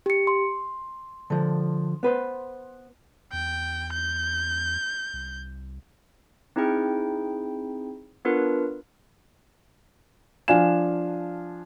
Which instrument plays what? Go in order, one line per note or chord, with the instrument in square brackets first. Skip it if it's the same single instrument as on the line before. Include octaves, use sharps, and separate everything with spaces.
[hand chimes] G4 C#7
C6
[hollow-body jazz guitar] D3 F3
B3 B4 C5
[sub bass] E2 [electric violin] G5
[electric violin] G6
[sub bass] C2
[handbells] C4 D#4 E4 G#4 G5
B3 D4 F4 A#4 B4
[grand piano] F3 D4 F5 G#5 E7